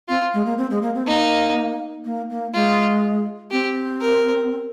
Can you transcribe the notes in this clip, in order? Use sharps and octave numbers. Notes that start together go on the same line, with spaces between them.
C4 F4
G#3
A#3
C4
G#3
A#3
C4
A#3 D#4
A#3
A#3
G#3 F4
C4 G4
A#4